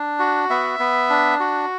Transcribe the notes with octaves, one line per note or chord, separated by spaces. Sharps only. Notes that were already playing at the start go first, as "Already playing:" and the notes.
Already playing: D4
F#4
B3 E5
B3
D4
F#4